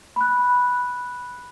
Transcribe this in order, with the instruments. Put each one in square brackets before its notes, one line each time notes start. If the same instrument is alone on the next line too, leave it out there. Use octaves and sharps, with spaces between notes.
[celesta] B5 F#6